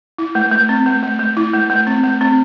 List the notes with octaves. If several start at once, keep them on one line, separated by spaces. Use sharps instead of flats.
E4
A3
A3
C4
A3
A3
A3
E4
A3
A3
C4
A3
C4